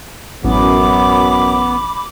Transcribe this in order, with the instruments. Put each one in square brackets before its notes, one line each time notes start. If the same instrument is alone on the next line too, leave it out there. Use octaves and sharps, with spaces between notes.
[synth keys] A1 [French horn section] F#2 [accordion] B3 [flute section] B5 D6